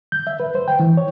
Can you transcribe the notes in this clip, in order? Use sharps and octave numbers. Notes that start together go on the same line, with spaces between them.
G6
E5
B4
C5
G5
E3
C#5